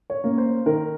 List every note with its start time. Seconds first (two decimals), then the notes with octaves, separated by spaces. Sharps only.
0.10 C#5
0.24 A#3 C#4
0.38 C5
0.66 D#3 A#4